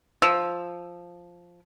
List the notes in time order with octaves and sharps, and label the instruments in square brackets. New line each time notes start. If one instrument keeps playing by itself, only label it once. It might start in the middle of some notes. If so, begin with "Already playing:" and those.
[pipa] F3 [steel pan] E6